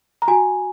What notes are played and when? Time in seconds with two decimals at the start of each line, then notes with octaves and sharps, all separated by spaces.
0.22 A#5
0.28 F#4 G#5